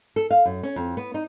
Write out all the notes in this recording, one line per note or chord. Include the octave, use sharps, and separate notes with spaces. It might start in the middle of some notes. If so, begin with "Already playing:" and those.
A4
F5
F#2
C#4
F2
B3
D#4